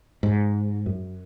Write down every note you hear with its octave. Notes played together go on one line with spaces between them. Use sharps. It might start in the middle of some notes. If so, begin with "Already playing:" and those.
G#2
F#2